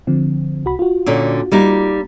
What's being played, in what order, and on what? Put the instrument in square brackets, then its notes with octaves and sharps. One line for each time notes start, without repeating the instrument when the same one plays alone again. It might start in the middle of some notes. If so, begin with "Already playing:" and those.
[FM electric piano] D3 F3 C4
C2 F#4 B5
F4 F#4
[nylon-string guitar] A#2 D3 C#4
G3 A#3 D#4